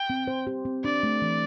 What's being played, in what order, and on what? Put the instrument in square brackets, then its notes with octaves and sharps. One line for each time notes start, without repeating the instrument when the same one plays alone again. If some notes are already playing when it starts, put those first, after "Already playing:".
Already playing: [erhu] G5
[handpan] C4
C5
G4
C4
[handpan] D4 [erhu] D5
[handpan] A3
E3